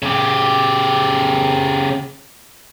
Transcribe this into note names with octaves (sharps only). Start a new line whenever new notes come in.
C#3 G4